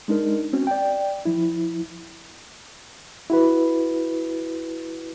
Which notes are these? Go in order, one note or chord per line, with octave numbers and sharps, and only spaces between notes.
G#3 D4 D#4 A#4
C4 C#4 F#4
D5 G5
F3 E4
E4 F#4 B4